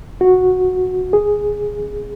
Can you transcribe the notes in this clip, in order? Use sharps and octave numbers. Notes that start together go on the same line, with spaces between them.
F#4
G#4